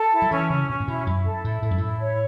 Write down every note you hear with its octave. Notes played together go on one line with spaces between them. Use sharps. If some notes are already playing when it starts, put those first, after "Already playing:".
Already playing: A4
E4
F#3
E3 C#4
C#3 C#4
B2 C#4
A2
B2 E4
F#2 E4
A4
A2 E4
A2 A4
F#2
A2 E4
C#5